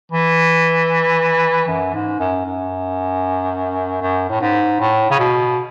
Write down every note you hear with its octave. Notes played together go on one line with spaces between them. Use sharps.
E3
F#2
G#2
F#2
F#2
F#2
A2
G#2
A2
C#3
B2